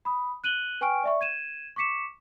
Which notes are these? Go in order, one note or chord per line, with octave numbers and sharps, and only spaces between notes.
B5 D#6
F#6 D#7 F#7 G7
B4 G5 G#5 C#6 F6 D7
D5 E5 C#6
G#6 D#7 E7
C#6 D6 B6 C#7 E7